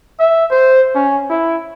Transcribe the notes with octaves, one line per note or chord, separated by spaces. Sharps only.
E5
C5
C#4
E4